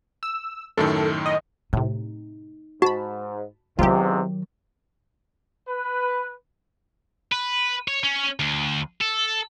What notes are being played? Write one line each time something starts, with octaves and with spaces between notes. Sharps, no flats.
E6
F#2 A2 D#3 A4
D#5
A2 C3 D#4
G#2 F#4 A5 B5
E2 G#2 C3 D#3 F#3 F4 G4
B4
B4
C#5
C#4
D2
A4